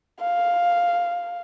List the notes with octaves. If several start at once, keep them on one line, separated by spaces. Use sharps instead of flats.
F5